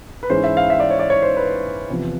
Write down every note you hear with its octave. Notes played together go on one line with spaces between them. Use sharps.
B4
G#2 E3 G#3 C#4 C5
E5
F5
E5
D5
C#5
D5
C#5
C5
B4
E2 C3 F3